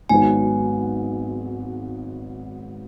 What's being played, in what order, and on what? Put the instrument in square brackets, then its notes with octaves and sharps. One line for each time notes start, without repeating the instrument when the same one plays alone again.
[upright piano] G#1 G#2 F#3 B3 [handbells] G#5